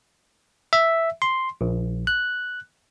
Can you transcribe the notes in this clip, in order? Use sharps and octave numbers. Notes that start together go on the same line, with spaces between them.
E5
C6
A#1
F#6